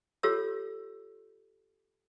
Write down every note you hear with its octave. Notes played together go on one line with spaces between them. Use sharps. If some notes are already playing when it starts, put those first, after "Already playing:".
F4 G4 A4 C#5 E6